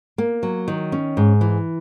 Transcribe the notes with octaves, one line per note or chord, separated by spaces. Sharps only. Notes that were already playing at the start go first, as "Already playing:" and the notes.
A#3
F#3
D#3
C#4
G#2
E3